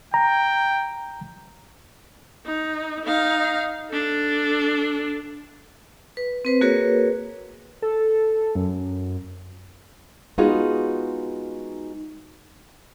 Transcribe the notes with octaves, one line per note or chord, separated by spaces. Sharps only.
G5 A#5
D#4
D#4 F5
D4 A4
B4
C4 B4 C5
A#3 F#4 G#4 A#4 B4 C#5
A4
F#2
G#3 B3 D#4 F4 F#4 G#4